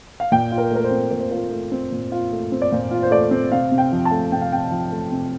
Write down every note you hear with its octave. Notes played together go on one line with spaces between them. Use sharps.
F5
A#2 G5
F4
A#4
A3 A#4
C5
C4
A#2 A#4
C5
F4 A#4
A3
C4
A#2
F4
A3
C4
D5
A#2 C5
F4
C5
A3 D5
C4
C3 F5
C3
G5
F3
A5
A3
C3 G5
F5
C3 G5
F3
A3
C3